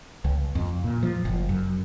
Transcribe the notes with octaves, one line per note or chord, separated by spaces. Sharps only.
C#2
F2
A#2
F3
F#1
F#2